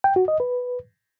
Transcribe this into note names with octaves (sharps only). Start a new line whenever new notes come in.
G5
F#4
D#5
B4